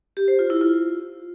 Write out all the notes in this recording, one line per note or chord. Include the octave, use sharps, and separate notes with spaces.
G4
C5
F4
E4
F4